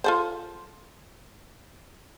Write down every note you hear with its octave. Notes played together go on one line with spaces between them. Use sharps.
F4 A4 C5